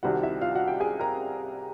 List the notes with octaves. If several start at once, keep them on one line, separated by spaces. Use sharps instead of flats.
C2 C3 D#3 G3 F#4 F#5
E4 E5
F4 F5
F#4 F#5
G4 G5
G#4 G#5
A#4 A#5